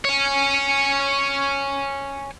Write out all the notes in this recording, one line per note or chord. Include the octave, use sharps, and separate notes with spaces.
C#5 G#5